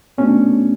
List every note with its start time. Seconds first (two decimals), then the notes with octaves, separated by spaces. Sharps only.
0.18 B2 A3 C#4 D4